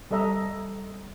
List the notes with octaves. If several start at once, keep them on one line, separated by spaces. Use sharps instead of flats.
G3 A4 D#5 E5 A#5